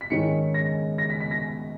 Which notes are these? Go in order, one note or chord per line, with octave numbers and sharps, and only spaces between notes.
B6
G#2 D#3 G#3 C#4 C#7
A#6
A#6
B6
B6
A#6